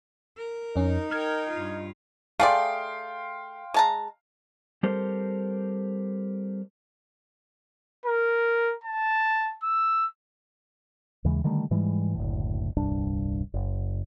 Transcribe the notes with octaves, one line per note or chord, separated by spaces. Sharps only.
A#4
F2 C#4 D#4
A#4 G5 F6 G#6
G2 F4
A3 G#4 D5 F5 G5 C6
G#3 A5 A#5
G3 C4 G4 A4 A#4 C5
A#4
A5
E6
D#2 C#3 E3 G#3
D3 D#3 G3 A3
G#2 E3 G3 G#3
F#1 D2 A2
D#1 C2 G2 D4
F#1